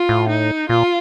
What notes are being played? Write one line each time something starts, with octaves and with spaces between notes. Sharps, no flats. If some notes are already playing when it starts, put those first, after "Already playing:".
Already playing: F4
A2
D#4
A#2 F4